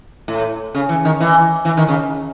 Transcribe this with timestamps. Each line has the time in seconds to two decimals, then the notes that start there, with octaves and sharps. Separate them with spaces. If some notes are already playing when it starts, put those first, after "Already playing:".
0.28 A2
0.75 C#3
0.89 E3
1.05 D#3
1.20 E3
1.65 E3
1.77 D#3
1.88 C#3